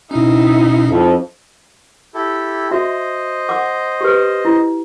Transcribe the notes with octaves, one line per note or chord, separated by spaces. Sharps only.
B2 C#4 D#4 E4
F2
E4 G4 A4
F#4 C5 D#5 E5
F#5 D6
G4 B4
E4